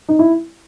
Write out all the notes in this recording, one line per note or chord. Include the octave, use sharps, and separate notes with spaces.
D#4
E4